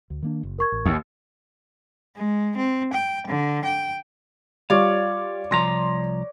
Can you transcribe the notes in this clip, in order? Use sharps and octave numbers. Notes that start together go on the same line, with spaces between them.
D2
D#3 A#3 D4
F#1
A#4 C#6 G#6
A1
D#2
G#3
C4
G5
D3
G5
G3 F4 C#5 D5 F5
C2 F3 A#5 C6 A#6